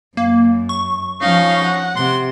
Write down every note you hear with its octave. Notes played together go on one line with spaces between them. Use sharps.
F#2 A#3
C#6
F3 C#4 D#4 F5
F#5
C3 C6